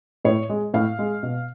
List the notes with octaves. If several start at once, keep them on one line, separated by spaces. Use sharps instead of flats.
A2 C#5
G#3
A2 F5
G#3
B2